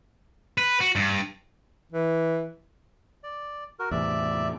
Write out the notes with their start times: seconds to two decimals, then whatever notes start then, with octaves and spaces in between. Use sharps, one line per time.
0.58 B4
0.80 F#4
0.96 G2
1.92 E3
3.23 D5
3.79 F#4 A#4
3.91 E2 A2 C3 D5 E5